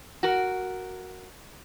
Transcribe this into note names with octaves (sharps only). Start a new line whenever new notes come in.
F#4 A#4